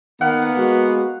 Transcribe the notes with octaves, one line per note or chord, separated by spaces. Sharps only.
D#3 A#3 B3 F5 F#5
G#3 F#4